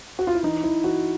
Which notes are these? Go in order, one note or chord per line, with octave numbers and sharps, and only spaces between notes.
F#4
F4
E4
E3 D#4
E3 E4
E3 F#4